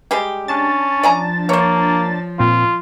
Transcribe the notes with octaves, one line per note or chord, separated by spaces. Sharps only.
G3 G#3 G4
C#4 D4 A5 A6
F3 D5 G#5 A#5
A#3 C5 C#5
A#2 C4 F4